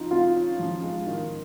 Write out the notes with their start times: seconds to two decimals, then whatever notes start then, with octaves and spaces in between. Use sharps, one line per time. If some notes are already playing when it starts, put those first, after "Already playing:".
Already playing: C#3 F3 C#4 D#4 F4
0.11 F2 F4
0.35 C#4
0.59 F3
0.83 G#3
1.06 D#3